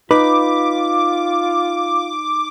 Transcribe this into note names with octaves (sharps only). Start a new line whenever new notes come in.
D#4 F4 B4 D6